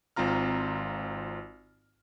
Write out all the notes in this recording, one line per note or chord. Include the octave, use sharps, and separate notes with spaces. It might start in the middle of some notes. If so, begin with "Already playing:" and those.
G#1 C4 F4 A#5 F6